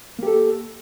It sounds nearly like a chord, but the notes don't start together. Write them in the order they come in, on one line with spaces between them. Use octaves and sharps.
A#3 G4 A4